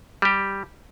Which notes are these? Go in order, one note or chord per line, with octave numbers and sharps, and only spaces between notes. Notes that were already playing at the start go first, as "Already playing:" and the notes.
G3 G4